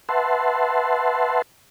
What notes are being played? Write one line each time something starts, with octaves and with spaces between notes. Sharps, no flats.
B4 E5 F#5 A5 C6